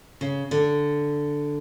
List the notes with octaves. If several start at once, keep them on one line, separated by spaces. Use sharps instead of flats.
C#3
D3